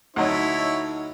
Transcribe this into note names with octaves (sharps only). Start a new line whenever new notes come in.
D2 F#3 D#4 E4 A4 C#5 D#5